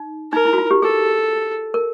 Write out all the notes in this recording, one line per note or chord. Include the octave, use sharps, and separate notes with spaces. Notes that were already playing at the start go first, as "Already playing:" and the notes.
Already playing: D#4
D#4 A#4
E4
F#4
F4
G4
G#4 A4
A#4